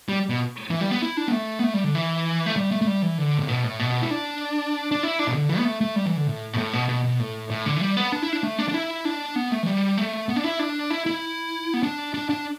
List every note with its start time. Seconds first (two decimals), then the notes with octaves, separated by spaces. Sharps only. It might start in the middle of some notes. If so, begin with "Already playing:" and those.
0.09 G3
0.29 B2
0.70 E3
0.81 G3
0.91 B3
1.02 E4
1.17 D4
1.28 B3
1.32 A3
1.59 B3
1.64 A3
1.74 G3
1.84 D3
1.95 E3
2.46 A3
2.56 G3
2.71 A3
2.82 A3
2.87 G3
3.02 E3
3.18 D3
3.38 A2
3.49 B2
3.64 A2
3.79 B2
4.02 E4
4.11 D4
4.91 D4
5.03 E4
5.19 D4
5.27 B2
5.34 D3
5.49 E3
5.58 B3
5.65 A3
5.81 A3
5.96 G3
6.06 E3
6.17 D3
6.27 A2
6.53 B2
6.58 A2
6.73 B2
6.89 B2
7.04 B2
7.20 A2
7.50 A2
7.66 D3
7.76 E3
7.81 G3
7.97 B3
8.12 D4
8.22 E4
8.33 D4
8.43 A3
8.59 D4
8.69 D4
8.74 E4
9.05 D4
9.36 B3
9.51 A3
9.63 E3
9.66 G3
9.98 A3
10.29 B3
10.36 D4
10.44 E4
10.59 D4
10.90 E4
11.06 E4
11.74 B3
11.83 D4
12.14 D4
12.30 D4